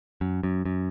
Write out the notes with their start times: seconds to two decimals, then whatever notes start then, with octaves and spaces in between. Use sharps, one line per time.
0.21 F#2
0.43 F#2
0.65 F#2